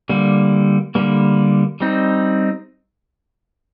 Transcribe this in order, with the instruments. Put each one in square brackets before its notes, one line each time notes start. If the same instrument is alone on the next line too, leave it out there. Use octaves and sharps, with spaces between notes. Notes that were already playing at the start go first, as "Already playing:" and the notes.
[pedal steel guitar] D3 G3 A#3
D3 G3 A#3
G3 C4 D#4